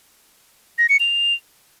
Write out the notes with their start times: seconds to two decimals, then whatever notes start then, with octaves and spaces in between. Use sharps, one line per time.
0.78 A#6
0.89 C#7
1.00 F7